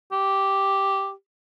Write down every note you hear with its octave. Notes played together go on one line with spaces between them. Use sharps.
G4